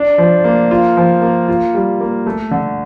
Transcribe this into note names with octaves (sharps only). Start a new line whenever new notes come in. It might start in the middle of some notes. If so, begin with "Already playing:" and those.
Already playing: D4
F3
A#3
F4
F3
A#3
F4
G3
A#3
A3
D3